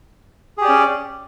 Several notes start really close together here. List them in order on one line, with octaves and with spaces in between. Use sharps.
G#4 G4 D5 C#4